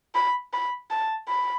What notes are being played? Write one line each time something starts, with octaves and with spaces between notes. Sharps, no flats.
B5
B5
A5
B5